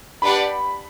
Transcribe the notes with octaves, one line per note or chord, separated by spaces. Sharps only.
D4 G4 B4 D5 F#5 B5